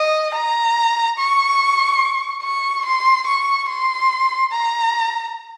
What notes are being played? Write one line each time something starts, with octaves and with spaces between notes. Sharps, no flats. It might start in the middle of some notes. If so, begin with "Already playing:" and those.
Already playing: D#5
A#5
C#6
C#6
C6
C#6
C6
A#5